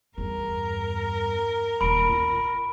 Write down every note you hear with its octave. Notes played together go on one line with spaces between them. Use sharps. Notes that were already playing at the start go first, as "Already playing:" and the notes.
E2 G2 A#4
D#1 D#3 B5 D7
F4